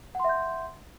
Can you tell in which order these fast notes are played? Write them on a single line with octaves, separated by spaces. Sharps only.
F#5 C6 E5 G6